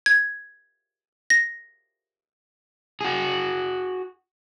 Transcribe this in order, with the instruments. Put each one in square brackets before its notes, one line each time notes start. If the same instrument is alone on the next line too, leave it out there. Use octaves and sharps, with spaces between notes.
[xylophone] G#6
A#6
[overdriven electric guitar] F#4 G#4